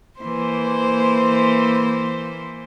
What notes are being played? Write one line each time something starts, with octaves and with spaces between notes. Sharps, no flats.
E3 A#3 C5